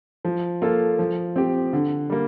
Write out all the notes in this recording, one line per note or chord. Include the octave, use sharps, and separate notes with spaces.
F3
A#3 F4 A4
F3
C4 G4
D3
G3 A#3